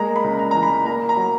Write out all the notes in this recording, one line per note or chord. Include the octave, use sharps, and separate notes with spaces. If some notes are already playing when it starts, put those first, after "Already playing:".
Already playing: G#3 A#3 A#5
B5
C#2
A#5
E3 A#5
B5
A#3 A#5
A#5
F#3